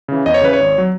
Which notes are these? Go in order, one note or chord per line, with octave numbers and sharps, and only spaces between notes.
C#3 E3
E2 D#5
C#5
C#3 E3 B4
C#5
G#1
F#3